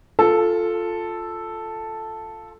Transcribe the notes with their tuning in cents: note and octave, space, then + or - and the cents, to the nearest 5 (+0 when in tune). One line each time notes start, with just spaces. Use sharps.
F4 +5 A4 +0